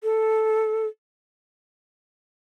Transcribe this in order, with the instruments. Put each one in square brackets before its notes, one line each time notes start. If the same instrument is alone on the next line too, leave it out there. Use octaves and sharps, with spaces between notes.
[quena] A4